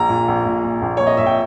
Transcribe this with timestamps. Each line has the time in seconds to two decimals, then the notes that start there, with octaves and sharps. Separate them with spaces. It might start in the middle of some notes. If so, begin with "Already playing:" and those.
Already playing: A#1 A#5
0.09 A#2
0.28 A#1
0.46 A#2
0.64 A#2
0.82 A#1
0.97 A#2 C#5
1.07 D#5
1.17 A#2 E5
1.26 G5